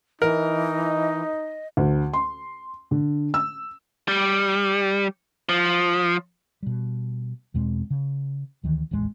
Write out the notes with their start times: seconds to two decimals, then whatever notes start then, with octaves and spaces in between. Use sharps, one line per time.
0.22 E3 D#4 A#4 D#5
1.77 D2
2.13 C6
2.91 D3
3.34 E6
4.08 G3
5.49 F3
6.63 B2 G3
7.54 E2 B2 G#3 C4
7.90 C#3
8.64 D2 D#3 E3
8.91 D1 A1 E2 G#3